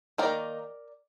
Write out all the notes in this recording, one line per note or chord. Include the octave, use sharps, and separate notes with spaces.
D#3 A#3 D#4 A#4 D5